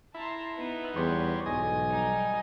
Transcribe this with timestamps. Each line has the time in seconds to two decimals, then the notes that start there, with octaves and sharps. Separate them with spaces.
0.14 E4 A5 A#5 C6
0.56 B3 D#4 B4
0.96 E2 G3 C5 C#5
1.46 B1 G#2 E3 D#5 G#5
1.90 G3 D#4